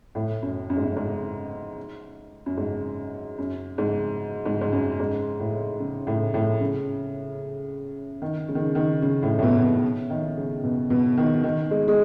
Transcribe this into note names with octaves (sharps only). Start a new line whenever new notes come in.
A2
F#2
F#2
G#2
F#2
G#2
F#2
G#2
F#2
G#2
G#2
G#2
F#2
G#2
A2
C#3
A2
A2
C#3
D#3
C#3
D#3
C#3
D#3
C#3
A2
A2
B2
B2
D#3
C#3
B2
B2
D#3
D#3
G#3
G#3